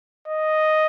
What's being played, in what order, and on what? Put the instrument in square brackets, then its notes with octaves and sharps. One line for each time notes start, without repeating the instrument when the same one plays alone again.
[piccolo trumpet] D#5